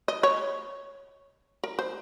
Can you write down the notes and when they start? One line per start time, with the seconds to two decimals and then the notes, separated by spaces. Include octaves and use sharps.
0.08 D#5
0.23 C#5
1.64 A#4
1.79 C5